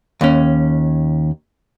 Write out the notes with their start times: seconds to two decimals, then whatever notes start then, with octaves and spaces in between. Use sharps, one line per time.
0.21 D#2 C#4